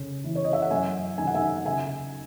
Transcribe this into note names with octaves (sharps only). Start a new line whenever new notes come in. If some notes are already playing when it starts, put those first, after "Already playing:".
Already playing: C#3
E3
C#5
D#5
E5
F#5
F#2 E5 G#5
D#3 G#5
F#5
E5 G#5
C#3 E5 G#5